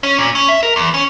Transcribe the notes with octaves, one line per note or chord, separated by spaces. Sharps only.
C#4
A#2
C#4
E5
A#4
E2
C#4